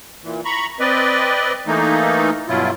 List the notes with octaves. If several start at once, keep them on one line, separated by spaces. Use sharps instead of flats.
A#2 E3
A#5 B5 C#6
C4 B4 D5 D#5
E3 A3 A#3 D#4
G2 B2 F#3 E4 F4